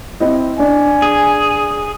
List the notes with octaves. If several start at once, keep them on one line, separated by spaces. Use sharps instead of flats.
C4 E4 D#5
D4 G#5
G#4